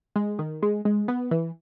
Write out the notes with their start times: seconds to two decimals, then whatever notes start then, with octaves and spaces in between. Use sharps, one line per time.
0.16 G#3
0.39 D#3
0.62 G#3
0.85 G#3
1.08 B3
1.31 E3